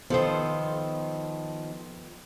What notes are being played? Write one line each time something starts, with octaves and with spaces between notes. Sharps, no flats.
D#3 F3 B3 A4 C5